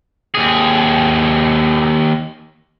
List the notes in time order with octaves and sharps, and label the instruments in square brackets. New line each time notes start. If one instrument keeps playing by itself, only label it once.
[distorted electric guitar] D#2 G#4